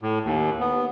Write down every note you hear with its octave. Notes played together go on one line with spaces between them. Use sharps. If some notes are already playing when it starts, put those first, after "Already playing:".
A2
D#2
B3